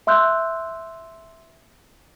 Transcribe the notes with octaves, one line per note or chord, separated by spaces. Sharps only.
E5 C6 E6 F#6 G6